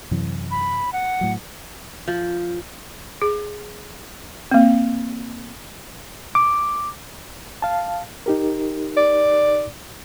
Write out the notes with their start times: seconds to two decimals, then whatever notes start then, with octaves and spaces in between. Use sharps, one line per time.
0.11 F#2 C3 E3
0.51 B5
0.93 F#5
1.21 A2 F#3
2.08 F3
3.22 G#4
4.51 A#3 C4
6.35 D6
7.62 F5 A5
8.26 D#4 G4 A#4
8.97 D5